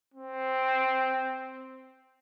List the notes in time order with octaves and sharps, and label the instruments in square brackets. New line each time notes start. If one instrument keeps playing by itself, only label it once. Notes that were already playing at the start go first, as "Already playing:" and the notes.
[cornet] C4